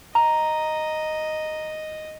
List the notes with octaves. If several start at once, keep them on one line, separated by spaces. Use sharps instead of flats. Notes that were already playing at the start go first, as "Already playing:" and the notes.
D#5 A#5